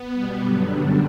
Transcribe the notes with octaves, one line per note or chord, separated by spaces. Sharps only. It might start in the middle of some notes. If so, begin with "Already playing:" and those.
Already playing: B3
B2 G3
G2 D3 F#3 B3
F#2 D3 G3 D4